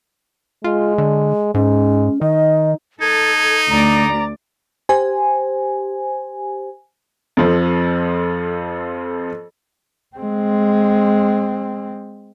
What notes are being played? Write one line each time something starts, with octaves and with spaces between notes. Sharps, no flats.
G#3 F4
D3
G#2 G#3 C#4
D#3 D#4 D#5
D#4 A4 G#6
D2 D5 A#5
G4 C5 G#5
F2 F3 A4
G#3 C4